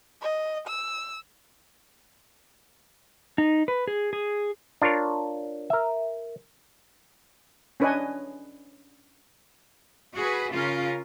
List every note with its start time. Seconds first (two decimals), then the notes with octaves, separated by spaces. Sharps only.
0.22 D#5
0.68 E6
3.38 D#4
3.68 B4
3.88 G#4
4.13 G#4
4.82 D4 F4 A#4 C#5
5.70 A#4 E5
7.80 C#4 D4 B4 C#5 D#5 G#5
10.16 F#4 G#4 B4
10.52 C#3 C#4 F4 A#4